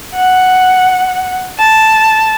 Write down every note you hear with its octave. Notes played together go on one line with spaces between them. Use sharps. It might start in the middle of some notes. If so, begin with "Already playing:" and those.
F#5
A5